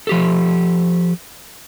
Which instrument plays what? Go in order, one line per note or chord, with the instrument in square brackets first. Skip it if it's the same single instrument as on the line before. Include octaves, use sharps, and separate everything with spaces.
[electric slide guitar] F3 G4 A4